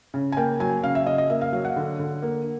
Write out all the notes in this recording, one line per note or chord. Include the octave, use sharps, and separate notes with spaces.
C#3
G#5
A#3 G5
F#3 G#5
C#3 F5
E5
C#3 D#5
D#5
A#3 E5
F5
F#3 F5
F#5
D3
D3
A#3